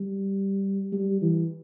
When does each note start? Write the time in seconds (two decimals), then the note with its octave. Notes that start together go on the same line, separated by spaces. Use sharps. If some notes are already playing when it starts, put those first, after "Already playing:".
Already playing: G3
0.92 G3
1.22 E3